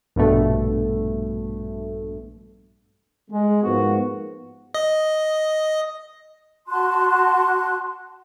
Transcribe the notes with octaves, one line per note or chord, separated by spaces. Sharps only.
A#1 G2 B2 A3
G#3
G#2 F3 A#3 B3 F#4
D#5
F#4 A5 C6 F#6